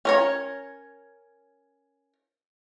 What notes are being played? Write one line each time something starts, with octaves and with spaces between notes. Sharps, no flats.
C#4 A#4 C#5